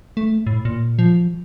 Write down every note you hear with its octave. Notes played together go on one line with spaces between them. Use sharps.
A3
A2
A#2
F3